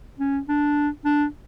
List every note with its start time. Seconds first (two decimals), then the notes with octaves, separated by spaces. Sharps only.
0.20 C#4
0.49 D4
1.05 D4